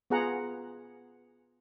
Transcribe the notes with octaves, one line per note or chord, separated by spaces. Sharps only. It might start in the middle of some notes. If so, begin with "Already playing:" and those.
B3 F4 G#4 F#5 A#5